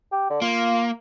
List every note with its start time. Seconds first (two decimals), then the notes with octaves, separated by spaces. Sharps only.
0.12 G4
0.30 D3
0.42 A#3 F4